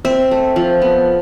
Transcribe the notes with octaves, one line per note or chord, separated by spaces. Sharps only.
C4 E5
A3
F3
B3